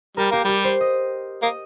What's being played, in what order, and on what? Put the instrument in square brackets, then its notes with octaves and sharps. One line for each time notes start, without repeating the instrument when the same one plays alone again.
[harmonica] G3 [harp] A#4
[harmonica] A#3 [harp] G4
[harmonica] G3 [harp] G4
[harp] C5
D#5
[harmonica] A#3 [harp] D#5